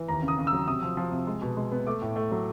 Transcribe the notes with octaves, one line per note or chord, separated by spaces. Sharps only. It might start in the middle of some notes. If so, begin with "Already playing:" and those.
Already playing: E3
D#2 A#5
C#3
D#6
C#3
E6
F#3
C3 D#6
F3
F3
C3
G#3
B2
G#3
B3
A3 D6
A2
A3
F#3